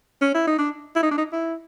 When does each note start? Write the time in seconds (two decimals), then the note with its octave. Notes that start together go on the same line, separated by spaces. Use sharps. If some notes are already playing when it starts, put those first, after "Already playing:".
0.21 C#4
0.35 E4
0.47 D#4
0.58 D4
0.96 E4
1.03 D#4
1.11 D4
1.18 D#4
1.32 E4